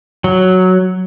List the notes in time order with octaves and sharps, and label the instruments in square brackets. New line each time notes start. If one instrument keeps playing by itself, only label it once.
[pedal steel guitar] F#3